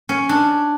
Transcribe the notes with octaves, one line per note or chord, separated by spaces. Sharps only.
C#4
D4